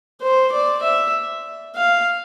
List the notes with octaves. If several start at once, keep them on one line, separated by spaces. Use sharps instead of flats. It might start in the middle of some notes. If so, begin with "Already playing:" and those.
C5
D5
E5
F5